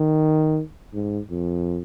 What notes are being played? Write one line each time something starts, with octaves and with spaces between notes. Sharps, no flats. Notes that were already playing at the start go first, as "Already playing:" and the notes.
Already playing: D#3
G#2
F2